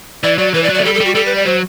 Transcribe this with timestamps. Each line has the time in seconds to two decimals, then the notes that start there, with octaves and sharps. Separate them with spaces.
0.23 E3 D5
0.38 F#3 D5
0.54 E3 B4
0.64 D5
0.69 F#3
0.74 D5
0.79 A3
0.84 G3 A4
0.95 A4
1.00 G3
1.05 F#4
1.15 G3 A4
1.26 B4
1.36 D5
1.45 F#3 C5